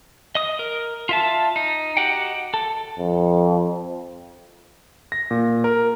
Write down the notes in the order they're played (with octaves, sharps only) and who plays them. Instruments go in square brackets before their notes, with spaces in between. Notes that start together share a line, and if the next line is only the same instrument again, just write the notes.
[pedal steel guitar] D#5 D#6
A#4
F4 E5 A5
D#4
F#4 G4 D#5 F#5 G5
A4
[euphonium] F2
[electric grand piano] A#6
A#2
A#4